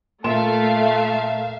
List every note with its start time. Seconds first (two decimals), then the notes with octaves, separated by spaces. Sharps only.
0.24 A#2 A3 E5 F5 A5 C6 E7